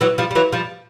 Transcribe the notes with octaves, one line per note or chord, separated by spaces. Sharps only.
E3 F#3
F3 G3
G3
E3 F#3
F3 G3